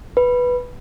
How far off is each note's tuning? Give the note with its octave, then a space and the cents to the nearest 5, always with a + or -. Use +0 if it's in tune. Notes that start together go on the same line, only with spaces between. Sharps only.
B4 -5